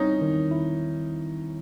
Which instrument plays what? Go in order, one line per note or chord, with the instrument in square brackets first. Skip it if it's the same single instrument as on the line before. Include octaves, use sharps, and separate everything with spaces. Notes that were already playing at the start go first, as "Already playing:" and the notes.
Already playing: [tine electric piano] G3 C4 E4 [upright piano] C#4 D#4
[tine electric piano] D#3
E4